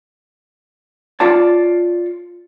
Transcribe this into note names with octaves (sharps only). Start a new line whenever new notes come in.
F4 C#5 D5 A5